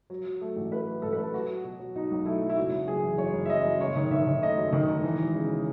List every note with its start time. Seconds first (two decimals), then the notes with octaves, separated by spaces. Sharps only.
0.10 F#3
0.25 F#3
0.41 A3
0.56 A1
0.71 A3 B4
0.87 F#3
1.02 A1 A4
1.12 B4
1.18 A3 A4
1.34 F#3 F#4
1.49 F#3
1.64 B2
1.79 F#3
1.96 B2 D#4
2.11 B1
2.25 A3 E4
2.41 F#3
2.49 E4
2.57 F#1 F#4
2.73 F#1
2.88 F#1 G#4
3.03 E3
3.18 F#2 C#5
3.33 F#1
3.45 E5
3.50 F#2 D#5
3.66 F#2
3.80 F#1 C#5
3.96 D#3
4.11 D#3 E5
4.27 D#3
4.42 A3 D#5
4.58 F#2
4.72 D#3
4.89 D#3
5.03 E3
5.20 E1
5.35 C#3